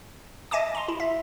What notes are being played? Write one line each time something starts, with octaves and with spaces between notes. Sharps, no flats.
D#5 E5 G#5 A5 D6
A#5 C6
E4
E5